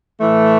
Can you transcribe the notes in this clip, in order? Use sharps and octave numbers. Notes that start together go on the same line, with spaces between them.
A2 E3 A3